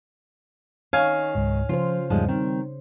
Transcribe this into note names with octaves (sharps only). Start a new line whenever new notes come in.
D#3 C#5 F5 G#5
C#2 G#2
C#3 F3 F4 C5
E2 G#2 F3 G3 G#3
D#3 G3 C4